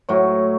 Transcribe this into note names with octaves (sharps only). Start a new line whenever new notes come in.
A2 F#3 C#5